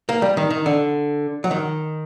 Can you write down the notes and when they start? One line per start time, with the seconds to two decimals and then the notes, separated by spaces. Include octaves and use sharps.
0.09 A#3
0.22 G3
0.37 D#3
0.50 D#3
0.66 D3
1.44 F#3
1.51 D#3